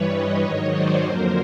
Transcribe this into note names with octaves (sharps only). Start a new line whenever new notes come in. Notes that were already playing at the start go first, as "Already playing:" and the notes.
Already playing: G2 E3 G3 B4 C#5
C#5 D#5
G#2 D#3 F#3 C#5 D#5
C5 D5
F2 D3 F#3 A#3 A#4 C5